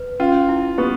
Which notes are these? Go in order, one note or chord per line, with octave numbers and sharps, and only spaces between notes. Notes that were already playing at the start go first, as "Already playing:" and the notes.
Already playing: B4
C#4 F4
E4
B3 G4